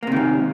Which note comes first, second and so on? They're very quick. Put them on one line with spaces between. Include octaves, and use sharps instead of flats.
A#3 C3 D#3 G#2